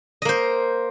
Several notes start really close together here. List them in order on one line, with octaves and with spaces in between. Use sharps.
D#5 A#3 C5